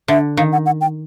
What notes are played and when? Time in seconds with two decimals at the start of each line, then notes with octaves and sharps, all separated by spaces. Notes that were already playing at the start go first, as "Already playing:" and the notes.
0.08 D3 E5
0.37 D#3 F5
0.52 F#5
0.66 F#5
0.81 G5